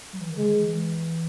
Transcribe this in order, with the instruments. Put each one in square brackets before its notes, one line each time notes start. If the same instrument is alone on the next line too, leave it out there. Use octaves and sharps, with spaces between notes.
[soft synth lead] F#3
E3
D#3
[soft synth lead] C#3 [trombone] G#3
[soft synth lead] D#3
E3
E3